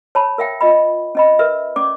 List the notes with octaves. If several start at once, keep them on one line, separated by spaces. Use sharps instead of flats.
C#5 A5 B5
A#4 E5 F5 G5
F4 D#5 B5
C#4 D#5 B5
A#4 B4 E5
C#4 D5 D6